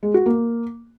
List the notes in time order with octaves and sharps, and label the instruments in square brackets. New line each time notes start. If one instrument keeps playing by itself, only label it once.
[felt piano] G#3
F#4
A#3